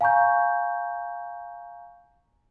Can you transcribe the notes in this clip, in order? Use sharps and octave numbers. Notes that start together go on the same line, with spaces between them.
F5 G#5 A#5 C#6 G6